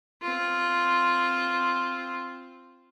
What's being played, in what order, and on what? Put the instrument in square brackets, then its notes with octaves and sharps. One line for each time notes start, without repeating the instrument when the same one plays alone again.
[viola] C4 F4